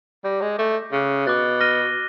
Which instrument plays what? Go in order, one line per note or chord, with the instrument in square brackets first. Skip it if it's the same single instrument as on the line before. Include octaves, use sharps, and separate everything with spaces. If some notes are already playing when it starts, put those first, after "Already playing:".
[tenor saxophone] G3 [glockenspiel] D6 G6 A#6
[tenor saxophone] G#3
[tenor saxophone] A3 [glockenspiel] D6 G6 A#6
[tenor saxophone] C#3 [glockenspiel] D6 F#6 A6
[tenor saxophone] B2 [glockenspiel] D6 F#6 A6
[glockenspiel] F6 A#6 D#7 G7